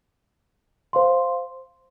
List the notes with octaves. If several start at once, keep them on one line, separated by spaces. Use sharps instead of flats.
C5 F5 C6